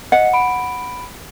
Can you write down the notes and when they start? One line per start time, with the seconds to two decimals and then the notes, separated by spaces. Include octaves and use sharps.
0.12 D#5 F#5
0.33 B5 D7